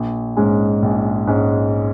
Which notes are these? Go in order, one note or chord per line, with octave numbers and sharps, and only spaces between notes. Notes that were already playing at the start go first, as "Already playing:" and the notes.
Already playing: A#1
G#2 G#3 C#4
A#1
G#2 G#3 C#4